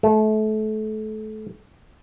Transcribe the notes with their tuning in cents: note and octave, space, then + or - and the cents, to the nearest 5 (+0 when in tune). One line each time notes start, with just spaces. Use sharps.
A3 -30